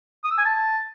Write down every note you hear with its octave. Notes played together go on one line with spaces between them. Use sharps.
D#6
E6
G#5
A5